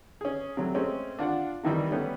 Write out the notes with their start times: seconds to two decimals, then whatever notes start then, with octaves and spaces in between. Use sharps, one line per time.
0.21 C#4 G#4
0.57 C3 F#3 A3
0.74 G#3 A3 C4 C#4
1.19 D4 F4 D5 F#5
1.63 C3 D#3 E3 G3
1.91 G3 A3 B3 C#4 G4